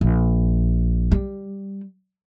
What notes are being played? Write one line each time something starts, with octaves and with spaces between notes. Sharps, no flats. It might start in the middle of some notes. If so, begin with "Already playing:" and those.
A#1
G3